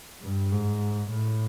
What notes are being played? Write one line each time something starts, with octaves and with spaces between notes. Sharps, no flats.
G2
G#2
A2